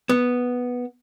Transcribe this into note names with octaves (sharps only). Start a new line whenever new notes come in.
B3